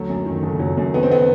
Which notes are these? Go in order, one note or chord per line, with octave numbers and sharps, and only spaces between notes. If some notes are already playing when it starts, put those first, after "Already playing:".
Already playing: D2 F#3 A3
F#2
D#3
F#1
F#3
F#2
D#3 B3
C4
B3